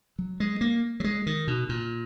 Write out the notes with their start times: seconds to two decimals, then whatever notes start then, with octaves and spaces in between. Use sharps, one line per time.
0.19 F#3
0.40 G#3
0.61 A#3
1.00 F#3
1.04 G#3
1.26 D#3
1.48 B2
1.69 A#2